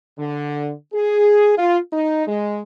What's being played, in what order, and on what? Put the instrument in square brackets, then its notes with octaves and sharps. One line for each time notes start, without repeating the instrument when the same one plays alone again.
[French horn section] D3
G#4
F4
D#4
G#3